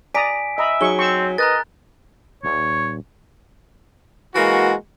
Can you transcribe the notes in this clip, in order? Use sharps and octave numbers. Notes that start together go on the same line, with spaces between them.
D5 G#5 A#5 D#6 B6 D7
D#5 E5 A#5 B5
F#3 D#4 G#4 C#6 G7
C4 C#6 E6
A#4 B4 D#5 A#5 F#6 A6
D#1 C#5
E3 G#3 A#3 F#4